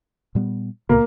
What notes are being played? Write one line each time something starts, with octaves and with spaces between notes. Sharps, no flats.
A#2 G3 B3
C#2 A#2 C#3 A#3